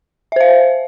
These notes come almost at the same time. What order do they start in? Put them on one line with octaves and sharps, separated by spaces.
E5 C5 F5